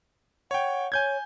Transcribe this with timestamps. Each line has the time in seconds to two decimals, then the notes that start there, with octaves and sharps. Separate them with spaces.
0.51 C#5 F#5 G5
0.92 C#5 G#5 G6 G#6